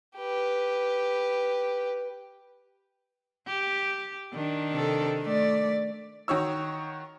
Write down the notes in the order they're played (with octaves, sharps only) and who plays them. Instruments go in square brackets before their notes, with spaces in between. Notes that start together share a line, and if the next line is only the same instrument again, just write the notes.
[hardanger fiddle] G4 B4
[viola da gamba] G4
D#3 D4
[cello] C3 A4
A3 D5
[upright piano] D#3 F#4 C#5 E6